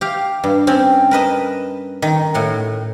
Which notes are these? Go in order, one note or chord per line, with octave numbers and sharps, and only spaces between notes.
G4 F5
G2
C4 C#4
A#4 B4 D#5 A5
D#3
A2 F#4